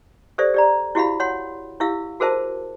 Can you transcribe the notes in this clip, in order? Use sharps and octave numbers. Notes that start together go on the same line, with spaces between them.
G4 A4 C5 D5 E5
G4 D5 A#5
E4 F#4 G4 E5 F5 B5
C#5 F#5 C6
E4 G4 E5 F5 E6
F#4 G#4 A#4 C5 E5 A5